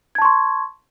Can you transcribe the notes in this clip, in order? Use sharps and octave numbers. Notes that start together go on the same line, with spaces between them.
A5 C6 C#6 G#6